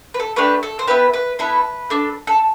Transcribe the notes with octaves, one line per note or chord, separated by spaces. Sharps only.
B4
A4
A3 D4 G4 B4
A4
C5
B3 E4 G4 B4
B4
B3 E4 A4 B4
D4 A4
A4